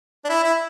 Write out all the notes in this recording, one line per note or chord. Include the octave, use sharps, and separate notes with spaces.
D4
E4
E4